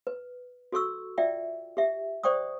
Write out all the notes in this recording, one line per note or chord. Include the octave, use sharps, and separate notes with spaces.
B4
F#4 A4 C#6 E6
F4 D5 E5 G5
G4 E5
C5 D5 G5 C#6 D#6